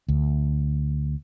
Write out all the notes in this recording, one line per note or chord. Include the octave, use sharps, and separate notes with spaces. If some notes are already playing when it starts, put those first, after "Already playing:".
D2